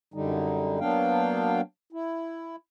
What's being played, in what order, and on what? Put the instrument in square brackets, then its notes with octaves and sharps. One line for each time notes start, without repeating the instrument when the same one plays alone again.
[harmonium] F#2 D3 G3 D#4
F#3 A#3 B3 D4 F5 G5
E4